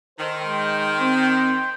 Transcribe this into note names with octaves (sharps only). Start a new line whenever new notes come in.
D#3 A4 C5
G#3 C5 G5
C4